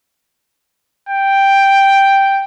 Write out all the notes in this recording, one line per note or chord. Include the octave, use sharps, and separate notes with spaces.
G5